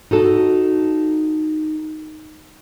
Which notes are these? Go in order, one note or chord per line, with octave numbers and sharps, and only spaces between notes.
D#4 F#4 A4 A5